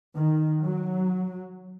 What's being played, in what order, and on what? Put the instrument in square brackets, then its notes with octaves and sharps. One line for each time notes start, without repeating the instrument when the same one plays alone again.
[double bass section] D#3
F#3